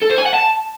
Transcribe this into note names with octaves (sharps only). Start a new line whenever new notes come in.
A4
C5
G#5
F#5
A5